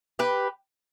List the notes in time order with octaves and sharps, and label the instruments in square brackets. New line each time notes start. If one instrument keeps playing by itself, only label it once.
[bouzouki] G4 B4